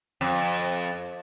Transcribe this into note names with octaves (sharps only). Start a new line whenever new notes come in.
F2